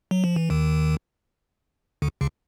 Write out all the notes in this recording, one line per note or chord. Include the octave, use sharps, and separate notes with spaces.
F#3
F3
E3
D#2 D#3
D2 D3
C#2 C#3